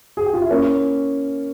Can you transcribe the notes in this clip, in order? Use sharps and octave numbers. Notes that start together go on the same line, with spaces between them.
G#4
G4
F4
E4
A#3 C#4